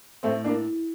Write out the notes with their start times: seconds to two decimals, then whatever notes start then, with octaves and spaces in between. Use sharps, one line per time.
0.23 A2 A3 C4
0.44 A#3 D4